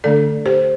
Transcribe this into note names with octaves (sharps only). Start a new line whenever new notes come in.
D3 A3 D4 A4 D5
G4 C5